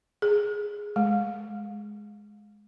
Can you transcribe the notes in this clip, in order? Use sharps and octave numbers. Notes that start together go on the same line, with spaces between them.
G#4
G#3